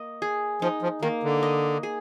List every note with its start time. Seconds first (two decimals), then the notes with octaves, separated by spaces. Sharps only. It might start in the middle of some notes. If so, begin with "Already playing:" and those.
Already playing: A#3 D#5
0.22 G#4
0.62 F3 D#4
0.82 F3
1.02 D#3 A#3
1.23 D3
1.43 D#5
1.83 G#4